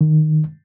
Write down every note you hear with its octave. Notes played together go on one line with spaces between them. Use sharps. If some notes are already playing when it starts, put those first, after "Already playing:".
D#3